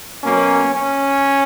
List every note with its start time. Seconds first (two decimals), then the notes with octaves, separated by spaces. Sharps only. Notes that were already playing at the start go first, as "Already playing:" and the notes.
0.22 B2 F#3 A#3 C#4
0.75 C#4